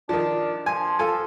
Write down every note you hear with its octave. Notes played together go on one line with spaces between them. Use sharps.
D#3 F3 D4
F3 G#5
F4 A4 G#5